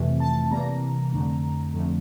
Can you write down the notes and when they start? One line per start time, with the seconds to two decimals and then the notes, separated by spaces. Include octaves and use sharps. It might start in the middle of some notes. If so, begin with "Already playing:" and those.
Already playing: F2 C3 E3 A3
0.20 A5
0.51 C3 E3 G3 A#3 A#5
1.13 F2 D3 A3
1.73 F2 D3 F3 A3